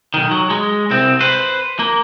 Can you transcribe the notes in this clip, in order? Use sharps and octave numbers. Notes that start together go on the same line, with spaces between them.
B1 D#3
F#3
G#3
C2 C4
B4 C5
A#3